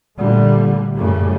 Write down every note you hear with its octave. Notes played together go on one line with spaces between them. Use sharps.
A#2 D3 G3 A3
F#2 A2 C#3 G3 A3